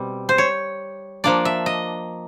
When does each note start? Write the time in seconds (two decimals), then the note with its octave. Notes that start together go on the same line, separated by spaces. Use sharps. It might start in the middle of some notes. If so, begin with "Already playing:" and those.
Already playing: B2 G3 C4
0.29 C5
0.38 C#5
1.24 F3 A#3 D4 D5
1.45 E5
1.66 D#5